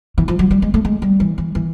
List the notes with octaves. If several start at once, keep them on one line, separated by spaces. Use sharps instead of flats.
E3
F3
F#3
G3
G#3
A3
G#3
G3
E3
E3
E3